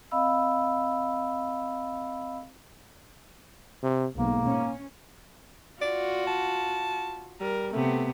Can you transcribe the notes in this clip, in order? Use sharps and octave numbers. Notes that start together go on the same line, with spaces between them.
C4 D#5 F5 B5 E6
C3
B1 G#2 A#3
C#4
F4 F#4 D5
A5
G3 A#4
C3 A3 B3